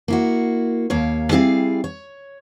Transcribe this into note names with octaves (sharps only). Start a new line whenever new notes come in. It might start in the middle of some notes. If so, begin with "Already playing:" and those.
A#3 E4 F#4
D#2 A#3 C#5 F5
G3 C4 E4 G#4 D5 F5
C#5